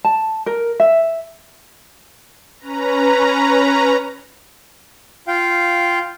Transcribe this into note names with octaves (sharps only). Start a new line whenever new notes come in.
A5
A#4
E5
C#4 B4 A#5
F4 F5 G5